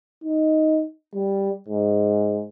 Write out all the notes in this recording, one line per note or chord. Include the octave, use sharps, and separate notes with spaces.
D#4
G3
G#2